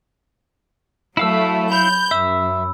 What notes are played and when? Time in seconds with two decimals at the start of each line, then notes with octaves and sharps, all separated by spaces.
1.17 F#3 A3 E4 F5 E6
1.72 B5 G6
2.11 F#2 E5 E6